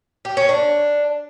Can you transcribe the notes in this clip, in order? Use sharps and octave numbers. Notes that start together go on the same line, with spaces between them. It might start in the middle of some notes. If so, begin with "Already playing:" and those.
G4
C#4
D4